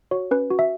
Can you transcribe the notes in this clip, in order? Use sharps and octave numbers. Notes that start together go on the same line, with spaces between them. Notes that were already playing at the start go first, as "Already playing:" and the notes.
F#4 C#5
C#4 B4
F#4
E5